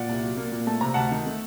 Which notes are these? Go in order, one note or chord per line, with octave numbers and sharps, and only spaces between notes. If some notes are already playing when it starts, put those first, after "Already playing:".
Already playing: A#2 D5 F#5
C2
F#3
A#3
A#2
A3 A5
C3 A#5
D2 F#5 A5
D#3
A3